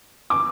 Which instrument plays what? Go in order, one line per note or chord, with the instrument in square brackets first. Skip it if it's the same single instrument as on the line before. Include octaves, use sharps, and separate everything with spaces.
[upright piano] D6